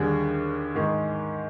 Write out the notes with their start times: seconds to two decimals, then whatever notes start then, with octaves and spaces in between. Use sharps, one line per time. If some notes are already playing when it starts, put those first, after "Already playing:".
Already playing: D#2 D3 G3 G#4
0.75 G#2 D#3 G#3